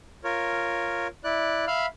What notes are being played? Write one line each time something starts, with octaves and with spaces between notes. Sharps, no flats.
F4 A#4 C#5
E4 D5 F#6
E5 F5 B5 F6